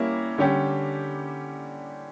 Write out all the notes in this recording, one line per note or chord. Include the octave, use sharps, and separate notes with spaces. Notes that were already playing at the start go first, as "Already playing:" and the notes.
Already playing: G3 A#3 C#4 E4
D3 G3 C#4 G4